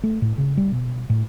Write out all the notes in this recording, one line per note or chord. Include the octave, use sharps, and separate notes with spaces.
A3
A2
C#3
G3
B2
A2